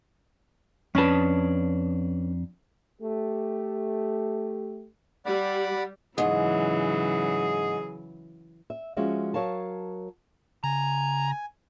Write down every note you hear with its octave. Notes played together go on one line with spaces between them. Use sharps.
F2 C#4 D4 B4 A5
A3 G4
G3 D5 F#5 B5
G#2 C#3 E3 F#3 G#4
E5
F3 G#3 C#4 F#4 E5 F5
F#3 A#4 C#5 F5 A5
C#3 G#5 A#5